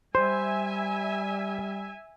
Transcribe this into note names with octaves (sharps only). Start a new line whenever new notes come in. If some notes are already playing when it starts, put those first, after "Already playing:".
G3 C5 E5 G#5